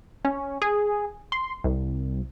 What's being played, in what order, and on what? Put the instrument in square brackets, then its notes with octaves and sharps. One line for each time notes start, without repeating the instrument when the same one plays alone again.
[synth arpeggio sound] C#4
G#4
C6
C2